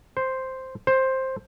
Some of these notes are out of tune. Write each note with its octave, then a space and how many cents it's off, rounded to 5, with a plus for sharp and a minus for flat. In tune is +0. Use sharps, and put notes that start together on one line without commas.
C5 +0
C5 +10